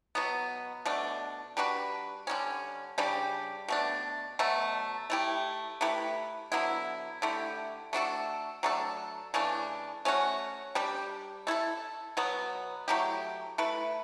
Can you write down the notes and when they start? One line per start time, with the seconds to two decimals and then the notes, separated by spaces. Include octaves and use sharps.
0.15 B2 F#3 B3
0.85 B2 A3 D4
1.57 G3 D4 F#4 B4
2.27 D3 G3 C#4
2.98 C#3 G3 D4 G4
3.68 B2 A3 D4
4.39 B2 F#3 A3
5.10 A3 E4 G4
5.81 A3 E4 G4 B4
6.52 D3 F#3 B3 E4
7.22 D3 A3 E4 G4
7.93 A3 D4 F#4 A4
8.63 F#3 A3 D4 A4
9.34 C#3 E3 A3 D4
10.05 A3 C#4 F#4
10.75 G3 D4 G4
11.47 A3 E4 A4
12.17 B2 F#3 B3
12.88 F#3 A3 E4 G4
13.58 A3 E4 B4